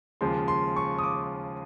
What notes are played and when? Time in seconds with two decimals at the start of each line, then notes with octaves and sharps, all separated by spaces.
0.21 D#2 C#3 F3 G#3 C6
0.48 C6
0.76 C#6
0.99 D#6
1.04 D6